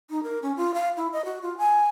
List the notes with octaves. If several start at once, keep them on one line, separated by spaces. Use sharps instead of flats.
D#4
A#4
C#4
F4
F5
E4
D#5
F#4
F4
G#5